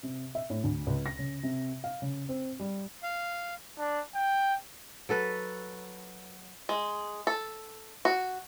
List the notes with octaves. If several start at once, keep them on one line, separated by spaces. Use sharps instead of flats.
C3
E5
A2
D2
C#2
A#6
C#3
C3
F5
C#3
C4
G3
F5
D4
G5
F#3 A4 B4
G#3
A4
F#4